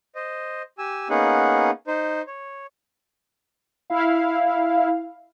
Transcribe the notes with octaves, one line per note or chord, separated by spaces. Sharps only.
C5 D#5
G4 G#5 E6
A#3 B3 C#4 D#4 G#4 F#5
D#4 C5
C#5
E4 F5